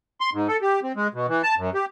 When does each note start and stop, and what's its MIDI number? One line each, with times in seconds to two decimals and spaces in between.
0.21 0.30 84
0.34 0.47 44
0.48 0.57 69
0.62 0.80 67
0.83 0.92 60
0.96 1.07 56
1.14 1.26 47
1.28 1.42 52
1.43 1.55 81
1.57 1.70 42
1.74 1.85 67